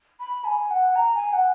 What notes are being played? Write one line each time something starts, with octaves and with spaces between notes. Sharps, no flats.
B5
G#5
F#5
A#5
G#5
F#5